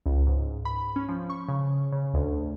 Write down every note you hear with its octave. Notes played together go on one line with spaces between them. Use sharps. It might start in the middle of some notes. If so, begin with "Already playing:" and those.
C#2
G#2
B5
C#4
F3
C#6
C#3
C#3
D2